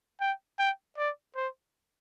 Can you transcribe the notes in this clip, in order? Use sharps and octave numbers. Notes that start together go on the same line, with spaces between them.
G5
G5
D5
C5